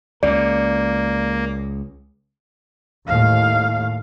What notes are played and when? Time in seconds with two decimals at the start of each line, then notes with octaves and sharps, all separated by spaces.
0.23 C#2 C#3 A#3 D5
3.08 D#2 A2 F5